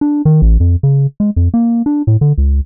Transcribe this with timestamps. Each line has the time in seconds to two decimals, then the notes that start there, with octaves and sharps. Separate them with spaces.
0.01 D4
0.25 D#3
0.42 A1
0.60 F2
0.83 C#3
1.20 G#3
1.36 F2
1.54 A#3
1.86 D4
2.07 A2
2.21 D3
2.38 C#2